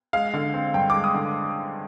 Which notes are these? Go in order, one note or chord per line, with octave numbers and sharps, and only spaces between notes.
G#3 F5
D3
C4
G2 G5
G#3 D6
D#6
D3